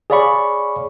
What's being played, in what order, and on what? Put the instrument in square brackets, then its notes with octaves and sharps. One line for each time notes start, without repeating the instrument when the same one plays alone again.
[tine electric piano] G#4 C#5 D5 F5 B5 C#6